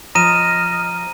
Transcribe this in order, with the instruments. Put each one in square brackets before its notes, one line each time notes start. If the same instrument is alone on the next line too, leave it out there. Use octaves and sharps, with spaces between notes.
[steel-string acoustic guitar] F3 [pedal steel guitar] D#5 [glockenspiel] A#5 D#7 [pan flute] F6